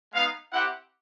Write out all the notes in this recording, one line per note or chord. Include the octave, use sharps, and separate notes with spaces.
G#3 B3 D#4 F5
C4 E4 G4 F#5